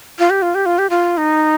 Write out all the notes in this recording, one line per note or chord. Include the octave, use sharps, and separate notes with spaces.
F4
G4
F4
G4
F4
G4
F4
D#4